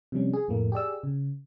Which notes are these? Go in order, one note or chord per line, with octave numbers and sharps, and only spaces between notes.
C3 F3 G3 C#4
G#4
F2 A2 A3 A#3
G4 G#4 D5 E6
C#3